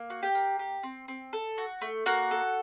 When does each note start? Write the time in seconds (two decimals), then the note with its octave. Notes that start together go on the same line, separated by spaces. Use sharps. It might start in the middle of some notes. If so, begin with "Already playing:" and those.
Already playing: A#3
0.10 F#4
0.23 G4 G5
0.35 A#3
0.59 G4
0.83 C4
1.08 C4
1.33 A4
1.58 F#4
1.82 A3
2.06 A#3 F#4 F#5
2.31 A4